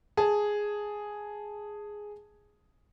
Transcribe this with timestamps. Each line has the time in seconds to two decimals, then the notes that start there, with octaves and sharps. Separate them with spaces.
0.17 G#4 A5